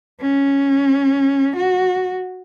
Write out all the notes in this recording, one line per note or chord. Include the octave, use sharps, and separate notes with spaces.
C#4
F#4